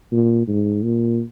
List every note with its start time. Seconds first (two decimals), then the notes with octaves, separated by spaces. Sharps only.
0.12 A#2
0.48 G#2
0.83 A#2